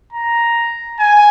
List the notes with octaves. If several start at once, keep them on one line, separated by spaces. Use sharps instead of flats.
A#5
G#5